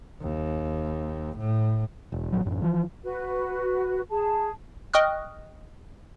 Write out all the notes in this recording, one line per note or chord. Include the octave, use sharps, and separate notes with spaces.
D#2
A2
E1
A1 F#2 F#3
A1 F#2
E3 F3
F#4 B4
G#4 A5
D#5 G5 C#6 D#6 F6 F#6